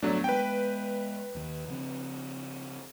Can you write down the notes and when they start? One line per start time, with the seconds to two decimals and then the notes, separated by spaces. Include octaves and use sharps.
0.02 D1 G2 F#3 A3 B3 D4
0.24 G#3 B3 B4 G5
1.35 D#2 D#3
1.68 C#3 F3 C4